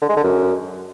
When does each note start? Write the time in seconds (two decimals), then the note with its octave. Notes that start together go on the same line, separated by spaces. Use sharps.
0.02 D3
0.09 G#3
0.16 D3
0.24 F#2